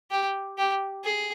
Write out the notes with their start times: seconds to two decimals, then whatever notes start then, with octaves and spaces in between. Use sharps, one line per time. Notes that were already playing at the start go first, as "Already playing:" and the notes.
0.11 G4
0.58 G4
1.04 G#4